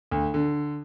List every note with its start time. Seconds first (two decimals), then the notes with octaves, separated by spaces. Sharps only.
0.11 D2
0.34 D3